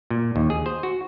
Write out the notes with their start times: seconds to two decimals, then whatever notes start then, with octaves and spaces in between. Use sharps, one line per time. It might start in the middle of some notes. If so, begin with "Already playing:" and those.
0.10 A#2
0.36 D#2
0.50 G#4
0.66 C5
0.83 F#4